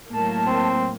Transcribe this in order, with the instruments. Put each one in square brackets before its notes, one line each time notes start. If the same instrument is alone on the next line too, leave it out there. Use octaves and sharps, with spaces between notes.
[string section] A2 F#3 A#3 [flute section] A5
[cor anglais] C4